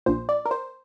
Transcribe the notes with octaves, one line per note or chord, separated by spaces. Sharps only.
A#1 A#2 C5
D5
A#4
C5